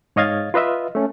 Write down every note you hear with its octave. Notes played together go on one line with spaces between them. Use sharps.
G#2 C#5 D#5 F5 G#6 A6
F4 B4 D#5 E5
A3 C#4